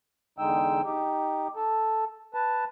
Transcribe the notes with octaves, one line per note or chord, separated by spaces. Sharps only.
E2 D3 G#3 D#4 G5 E6
D#4 G4
A4
B4 A5